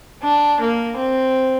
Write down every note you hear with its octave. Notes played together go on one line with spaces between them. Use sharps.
D4
A#3
C4